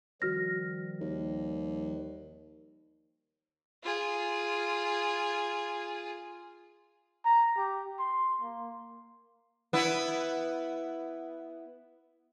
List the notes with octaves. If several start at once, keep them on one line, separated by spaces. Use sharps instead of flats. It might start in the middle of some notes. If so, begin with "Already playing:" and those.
D#3 F3 G3 F#4 F6 A#6
D#2
F4 G#4
A#5
G4
C6
A#3
B3 E4